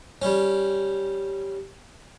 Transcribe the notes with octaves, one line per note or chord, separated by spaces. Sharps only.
G3 C#4